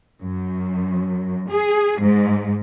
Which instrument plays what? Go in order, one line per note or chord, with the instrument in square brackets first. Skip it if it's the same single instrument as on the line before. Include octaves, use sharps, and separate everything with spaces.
[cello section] F#2
G#4
G#2